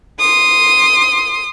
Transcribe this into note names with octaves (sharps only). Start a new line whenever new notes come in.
C6 D#6